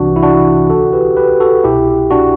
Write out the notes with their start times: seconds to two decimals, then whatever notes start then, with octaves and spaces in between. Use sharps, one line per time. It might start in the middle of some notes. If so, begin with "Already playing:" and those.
Already playing: C2 C3 E3 D4 F#4
0.16 E4
0.22 D4 F#4
0.69 D2 D3 F#4 A4
0.93 G4 B4
1.17 G4 B4
1.40 F#4 A4
1.64 C2 B2 E4 G4
2.10 D4 F#4